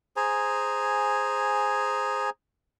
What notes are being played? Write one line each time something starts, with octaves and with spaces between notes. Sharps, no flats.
G#4 C5 G#5 A#5